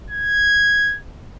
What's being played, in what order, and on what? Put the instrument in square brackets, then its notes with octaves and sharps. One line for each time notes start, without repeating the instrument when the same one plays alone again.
[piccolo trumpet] G#6